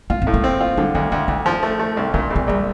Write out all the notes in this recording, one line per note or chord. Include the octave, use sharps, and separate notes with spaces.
A#3 F4
C4
A2
A#3
C4
F4
D3 G3
D2 D#3
D2 D4
D2 D#4
F3
A3
A3
C2
A#2 D4
A#1
C4
A#1 G3